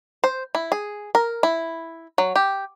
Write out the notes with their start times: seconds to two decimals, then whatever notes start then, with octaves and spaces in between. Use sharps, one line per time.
0.24 C5
0.55 E4
0.72 G#4
1.15 A#4
1.43 E4
2.18 F#3
2.36 G4